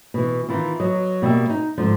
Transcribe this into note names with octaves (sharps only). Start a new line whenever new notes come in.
B2 E3
D#3 E3 E4 F4
F#3 D#5
B2 G3 A#3 E5
D#4
G#2 D3 F3